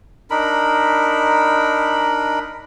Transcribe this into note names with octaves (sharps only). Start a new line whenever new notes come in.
D4 D#4 A#4 B5